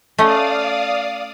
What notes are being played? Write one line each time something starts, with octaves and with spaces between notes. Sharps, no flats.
A3 C#4 D5 D#5 F5 D#6